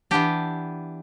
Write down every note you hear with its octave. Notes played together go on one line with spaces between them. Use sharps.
E3 B3 D4 G4